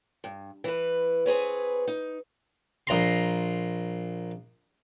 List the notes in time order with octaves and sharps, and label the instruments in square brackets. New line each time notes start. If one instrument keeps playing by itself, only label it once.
[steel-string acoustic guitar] G2
E3 B4
C4 G#4 B4 C#5
D#4
[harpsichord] A#1 A#5 C6